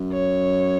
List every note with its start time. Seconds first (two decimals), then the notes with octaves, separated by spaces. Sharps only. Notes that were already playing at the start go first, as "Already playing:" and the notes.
Already playing: F#2
0.13 C#5